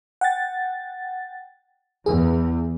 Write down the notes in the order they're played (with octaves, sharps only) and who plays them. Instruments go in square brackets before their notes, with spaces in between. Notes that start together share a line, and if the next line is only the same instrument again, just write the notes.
[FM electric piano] F#5 G5 A6
[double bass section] E2 [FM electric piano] G#4